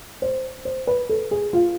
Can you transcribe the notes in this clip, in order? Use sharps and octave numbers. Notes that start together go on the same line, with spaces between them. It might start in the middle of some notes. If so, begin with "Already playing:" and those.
C5
C5
B4
A4
G#4
F4